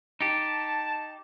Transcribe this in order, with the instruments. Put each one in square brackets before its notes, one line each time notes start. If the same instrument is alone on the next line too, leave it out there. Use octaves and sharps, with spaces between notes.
[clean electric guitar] D#4 G4 [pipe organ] A5